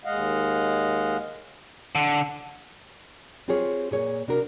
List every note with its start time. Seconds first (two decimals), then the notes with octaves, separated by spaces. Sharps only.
0.05 D#2 G#3 D#5 F5 F#5
1.95 D3
3.48 C4 F4 G4 G#4 C#5
3.91 A#2 G#4 C#5
4.28 C3 D4 F#4 A#4